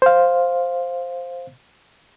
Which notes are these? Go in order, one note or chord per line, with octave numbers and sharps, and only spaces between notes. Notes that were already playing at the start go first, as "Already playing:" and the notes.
C5 F5